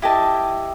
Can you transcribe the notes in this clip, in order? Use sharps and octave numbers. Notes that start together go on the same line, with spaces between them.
E4 G4 D#5 A5